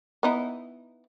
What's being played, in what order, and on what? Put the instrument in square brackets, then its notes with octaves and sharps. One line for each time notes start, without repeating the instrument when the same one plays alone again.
[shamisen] B3 D#4 E4